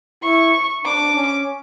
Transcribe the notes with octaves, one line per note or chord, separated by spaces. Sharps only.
E4 C#6
D4 D6
C#4